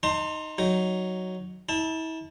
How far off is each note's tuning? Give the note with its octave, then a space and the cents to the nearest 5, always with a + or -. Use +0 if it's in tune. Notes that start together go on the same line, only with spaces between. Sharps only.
D#4 +0 A5 +45 C6 +10
F#3 +0 D#4 +0
E4 -40 A5 +0